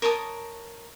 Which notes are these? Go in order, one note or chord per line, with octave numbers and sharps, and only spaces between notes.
A#4 C#5 A5 D#6